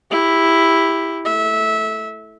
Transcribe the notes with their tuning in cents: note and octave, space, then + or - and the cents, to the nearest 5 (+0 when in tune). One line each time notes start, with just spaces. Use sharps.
E4 +0 G4 +15
A3 -10 E5 -20